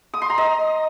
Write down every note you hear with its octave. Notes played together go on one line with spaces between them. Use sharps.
D#6
C6
A#5
D#5